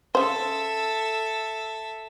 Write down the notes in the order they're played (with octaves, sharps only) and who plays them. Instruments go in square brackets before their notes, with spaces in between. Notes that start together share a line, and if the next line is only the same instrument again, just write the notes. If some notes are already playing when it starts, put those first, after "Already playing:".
[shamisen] C#3 C5 [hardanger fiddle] A4 E5